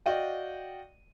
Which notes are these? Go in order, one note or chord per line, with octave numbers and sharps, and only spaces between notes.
F#4 D5 D#5 F5 G5